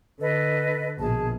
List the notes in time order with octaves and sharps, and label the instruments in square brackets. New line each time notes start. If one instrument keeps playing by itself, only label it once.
[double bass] D3 [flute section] A4 B4 D#5
[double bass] A#1 B2 [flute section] G#4 A5